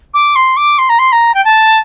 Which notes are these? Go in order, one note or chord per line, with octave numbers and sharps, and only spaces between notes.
D6
C6
D6
C6
A#5
C6
A#5
G5
A5